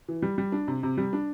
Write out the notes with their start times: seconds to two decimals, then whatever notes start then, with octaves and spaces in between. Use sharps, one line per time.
0.08 E3
0.22 G3
0.38 G3
0.52 D4
0.68 C3
0.83 C3
0.98 G3
1.13 D4